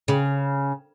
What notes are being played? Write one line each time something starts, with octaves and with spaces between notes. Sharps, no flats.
C#3